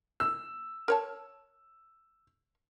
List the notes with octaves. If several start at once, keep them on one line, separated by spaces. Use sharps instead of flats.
E6
A#4 C#5 A5